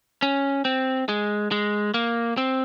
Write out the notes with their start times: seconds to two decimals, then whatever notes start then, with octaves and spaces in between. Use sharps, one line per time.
0.22 C#4
0.65 C4
1.09 G#3
1.52 G#3
1.94 A#3
2.38 C4